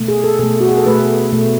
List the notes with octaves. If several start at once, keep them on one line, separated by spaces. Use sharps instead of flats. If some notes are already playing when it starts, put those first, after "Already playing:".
Already playing: B2 A3
G#4
A4
B2 A3 A4
F#4
G#4
A4
B2 A3 B4
B2 A3